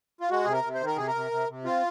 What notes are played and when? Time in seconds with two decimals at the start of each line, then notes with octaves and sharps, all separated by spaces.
0.21 F4
0.30 G#3 F#4
0.44 C3 G#4
0.53 A#4
0.64 C3
0.75 C5
0.81 D#3
0.86 A#4
0.96 C3 G#4
1.08 A#4
1.15 C3
1.31 C3
1.49 C3
1.65 C4 F4